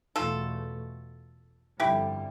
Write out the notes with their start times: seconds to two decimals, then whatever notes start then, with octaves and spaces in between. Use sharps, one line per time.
0.16 E2 B2 A3 F4 A4
1.79 G1 F2 D3 G3 E4 G4